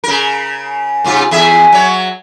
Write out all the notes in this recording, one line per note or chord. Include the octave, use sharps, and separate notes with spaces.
C#3 A#4
G#2 C3 F4
E2 G#4 E5
F#3 C#5